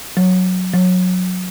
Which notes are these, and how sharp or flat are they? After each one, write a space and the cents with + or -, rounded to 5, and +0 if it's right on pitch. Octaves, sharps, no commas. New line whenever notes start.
F#3 -10
F#3 -20